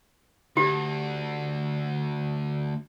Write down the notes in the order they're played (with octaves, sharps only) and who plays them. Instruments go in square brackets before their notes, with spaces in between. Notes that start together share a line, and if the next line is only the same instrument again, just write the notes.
[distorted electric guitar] D2 [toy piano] G4